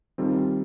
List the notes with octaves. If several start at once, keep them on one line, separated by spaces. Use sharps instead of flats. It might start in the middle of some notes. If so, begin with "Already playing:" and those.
D#3 G3 C4 F4 A4